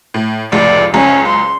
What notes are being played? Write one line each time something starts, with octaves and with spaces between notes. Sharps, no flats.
A2
F1 C#2 A2 D5
F#1 C#2 C#4 A#5
C6